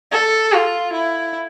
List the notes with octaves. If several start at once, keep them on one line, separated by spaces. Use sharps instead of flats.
A4
F4
E4